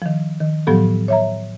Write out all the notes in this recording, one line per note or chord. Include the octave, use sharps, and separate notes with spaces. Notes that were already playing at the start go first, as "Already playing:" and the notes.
D#3 F3
D#3
A2 F3 F#3 B3 G4 A4
C#5 E5 A#5